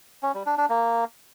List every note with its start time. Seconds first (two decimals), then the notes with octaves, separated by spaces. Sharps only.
0.23 C#4
0.35 G3
0.46 D4
0.58 D4
0.69 A#3